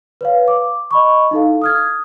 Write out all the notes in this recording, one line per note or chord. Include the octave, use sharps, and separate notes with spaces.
B4 C#5 F5
D6
D#5 B5 C#6
D#4 E4 A4 F5
D#6 F6 G#6